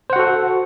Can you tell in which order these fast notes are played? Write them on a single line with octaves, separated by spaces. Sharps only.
C5 F#5 F#4 A4